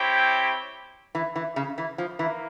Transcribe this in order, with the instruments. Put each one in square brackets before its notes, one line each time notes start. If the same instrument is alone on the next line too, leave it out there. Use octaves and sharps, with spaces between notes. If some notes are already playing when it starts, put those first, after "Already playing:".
Already playing: [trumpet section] C4 E4 G4 C#5 G5
[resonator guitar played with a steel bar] E3
E3
C#3
E3
F3
[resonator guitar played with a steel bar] E3 [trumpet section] A#3